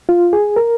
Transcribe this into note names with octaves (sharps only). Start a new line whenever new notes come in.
F4
G#4
A#4